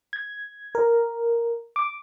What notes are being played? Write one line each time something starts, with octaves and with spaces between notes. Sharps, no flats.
G#6
A#4
D6